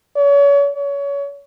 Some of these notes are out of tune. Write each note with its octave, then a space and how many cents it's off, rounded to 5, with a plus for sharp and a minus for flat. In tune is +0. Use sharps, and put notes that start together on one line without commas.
C#5 +35
C#5 +25